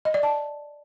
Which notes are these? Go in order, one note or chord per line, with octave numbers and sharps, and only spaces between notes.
D#5
D5
A5